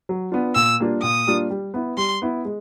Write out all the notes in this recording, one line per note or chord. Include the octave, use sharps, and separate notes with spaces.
F#3
B3 D4 F4
A#2 E6
G3 A#3 D4 F4
A#2 D#6
G3 A#3 D4 F4
G3
B3 E4
G3 C6
B3 E4
G#3